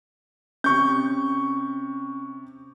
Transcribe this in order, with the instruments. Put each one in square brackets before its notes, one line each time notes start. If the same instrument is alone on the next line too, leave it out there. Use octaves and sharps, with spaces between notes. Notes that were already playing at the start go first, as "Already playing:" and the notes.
[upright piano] C3 C#6 G6 [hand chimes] C#4